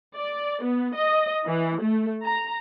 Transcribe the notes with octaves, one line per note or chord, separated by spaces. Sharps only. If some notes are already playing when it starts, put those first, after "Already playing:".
D5
B3
D#5
E3
A3
A#5